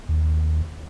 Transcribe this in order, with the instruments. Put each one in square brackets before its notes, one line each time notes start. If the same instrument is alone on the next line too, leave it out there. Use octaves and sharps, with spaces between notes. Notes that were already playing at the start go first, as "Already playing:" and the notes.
[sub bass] D#2